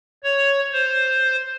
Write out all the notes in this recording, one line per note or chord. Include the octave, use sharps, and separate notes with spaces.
C#5
C5